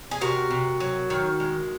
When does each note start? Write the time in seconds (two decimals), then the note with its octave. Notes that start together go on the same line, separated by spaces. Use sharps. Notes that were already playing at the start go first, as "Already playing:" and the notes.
0.11 G#4
0.21 C3 F#4 A#4
0.51 C3
0.80 F#3
1.10 D#3
1.40 G#3